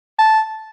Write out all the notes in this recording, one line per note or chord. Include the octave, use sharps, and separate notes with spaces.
A5